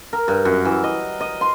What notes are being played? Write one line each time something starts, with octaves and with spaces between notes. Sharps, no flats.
A#4
G2
F#2
E3
D#5
D#5
C6